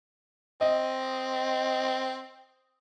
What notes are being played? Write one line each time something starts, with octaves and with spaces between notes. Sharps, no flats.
C4 D#5